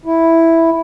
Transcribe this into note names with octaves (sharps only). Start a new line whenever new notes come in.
E4